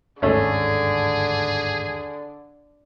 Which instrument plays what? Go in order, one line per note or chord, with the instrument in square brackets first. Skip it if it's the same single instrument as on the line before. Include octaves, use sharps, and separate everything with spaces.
[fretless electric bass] G1 D#2 G#2 [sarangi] D3 [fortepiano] A3 C#4 [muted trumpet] G#4